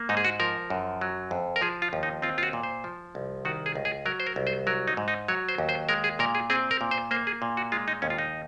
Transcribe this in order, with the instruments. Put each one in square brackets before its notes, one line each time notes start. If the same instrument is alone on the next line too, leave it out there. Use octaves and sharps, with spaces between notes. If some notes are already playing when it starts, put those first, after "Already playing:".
Already playing: [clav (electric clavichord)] A#3
G#2 D#4
G#4
F#4
F3 A#4
F#2
F#3
F2
A#4
F3 G#4
F4
D#2
D#4
C4 F4
F4
F#4
A#2
C5
F3
C2
D#3 F#4
G#4
C#2
G#4
F#3 A#4
C5
A#4
C2
C5
F#3 A#4
D#4
G#2
D#4
F#3 C#5
C5
D#2
C5
G#3 A#4
G#4
A#2 A#4
G#4
C4 G#4
A#4
A#2
C5
A#3 C5
G#4
A#2
F#4
G#3 F4
D#4
D#2 C#4
F4
D#4